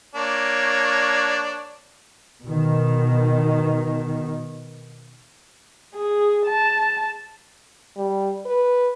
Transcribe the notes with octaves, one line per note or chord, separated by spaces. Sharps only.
A#3 D4 C#5
B2 D#3
G#4
A5
G3
B4